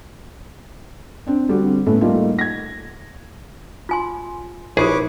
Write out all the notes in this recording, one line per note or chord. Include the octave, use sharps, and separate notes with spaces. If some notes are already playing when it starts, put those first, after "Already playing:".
C4 D4
D3 G3 C4 F#4
A2 A3 B3 C#4
G3 A3 A#3 D#4 F4
G#6 A#6
F4 G#5 C6
A#1 D#4 E4 G4 G#4 B4 C#5 D6